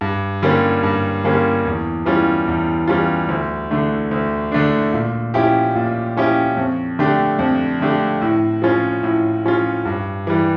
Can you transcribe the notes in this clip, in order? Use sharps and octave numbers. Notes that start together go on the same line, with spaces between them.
G2
D3 G3 A#3 C#4
G2
D3 G3 A#3 C#4
E2
E3 G3 C#4 F4
E2
E3 G3 C#4 F4
D2
D3 A3 D4
D2
D3 A3 D4
A#2
F3 C#4 E4 G4
A#2
F3 C#4 E4 G4
F2
D3 A3 D4 G4
F2
D3 A3 D4 G4
A2
F3 C#4 F4
A2
F3 C#4 F4
G2
E3 G3